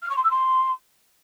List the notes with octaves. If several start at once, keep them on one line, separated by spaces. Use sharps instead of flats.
F6
C#6
C6
E6
C6